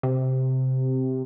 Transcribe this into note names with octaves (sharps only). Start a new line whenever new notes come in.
C3